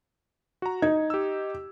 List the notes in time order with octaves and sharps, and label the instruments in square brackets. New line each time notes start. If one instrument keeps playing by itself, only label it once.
[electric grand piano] F#4 A#5
[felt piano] D#4 [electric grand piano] G#6
[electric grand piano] G4 E6